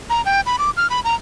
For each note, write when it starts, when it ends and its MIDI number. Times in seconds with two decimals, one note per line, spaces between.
0.10 0.24 82
0.25 0.41 79
0.46 0.57 83
0.59 0.70 86
0.77 0.87 89
0.90 1.00 83
1.04 1.15 82